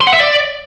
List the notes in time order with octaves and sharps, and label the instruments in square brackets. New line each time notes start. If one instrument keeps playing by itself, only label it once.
[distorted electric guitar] C6
F#5
E5
D5